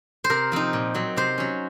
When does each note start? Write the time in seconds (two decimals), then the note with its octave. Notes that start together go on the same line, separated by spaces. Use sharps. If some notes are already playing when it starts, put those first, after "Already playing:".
0.24 C5
0.30 C3 A#4
0.52 F3 C4 D#4
0.73 A#2
0.95 F#3 C4
1.17 C3 C5
1.38 F#3 C#4